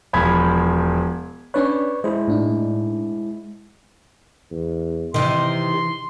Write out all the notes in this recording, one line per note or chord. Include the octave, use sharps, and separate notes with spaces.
E1 F3 B5 G#6
C#4 D4 B4 C#5 D5 C#6
G#3 E4 C5
A2 D4 D#4
E2
C3 D#3 E3 C6